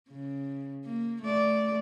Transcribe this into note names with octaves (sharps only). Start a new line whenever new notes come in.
C#3
A#3
A3 D5